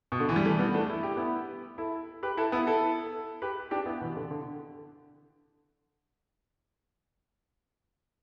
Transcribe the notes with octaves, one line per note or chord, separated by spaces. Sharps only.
B2
D3
E3
G3
E3 A3
G3 B3
A3 D4
E4
G4
B3 E4
E4 A4
G4 B4
E4 A4
B3 E4
E4 A4
G4 B4
D4 G4
B3 E4
B2 E3
D3
D3